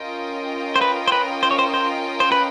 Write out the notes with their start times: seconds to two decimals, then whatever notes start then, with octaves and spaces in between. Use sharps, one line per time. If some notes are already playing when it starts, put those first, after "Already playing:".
Already playing: C#4 F4 A#4 D#5 G5
0.76 C5
0.81 B4
1.08 C5
1.12 B4
1.43 C5
1.51 C#5
1.59 C5
1.74 C5
2.20 C5
2.32 B4